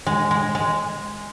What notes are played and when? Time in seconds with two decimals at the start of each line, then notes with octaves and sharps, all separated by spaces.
0.07 G#3
0.31 G#3
0.55 G#3